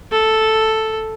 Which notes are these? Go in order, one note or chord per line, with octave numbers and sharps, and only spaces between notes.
A4